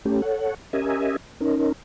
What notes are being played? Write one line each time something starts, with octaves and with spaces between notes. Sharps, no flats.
A3 C#4 G4
A4 C#5 F#5
C#4 G4 A#4 D#5 E5 G#5
C#4 D#4 A#4